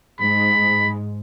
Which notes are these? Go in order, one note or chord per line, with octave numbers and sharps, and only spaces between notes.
G#2 G#3 B5